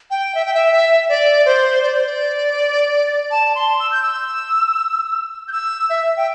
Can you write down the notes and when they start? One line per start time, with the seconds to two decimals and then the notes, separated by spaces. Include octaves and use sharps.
0.11 G5
0.35 E5
0.45 G5
0.54 E5
0.72 E5
1.09 D5
1.46 C5
1.83 D5
1.95 C5
2.07 D5
3.31 A5
3.55 C6
3.80 E6
3.92 G6
4.03 E6
5.48 G6
5.52 E6
5.90 E5
6.17 G5